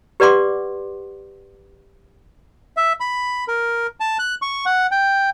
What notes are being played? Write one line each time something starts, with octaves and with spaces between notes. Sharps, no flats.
G4 B4 D5 F#5 C6 D6
E5
B5
A#4
A5
F#6
C#6
F#5
G5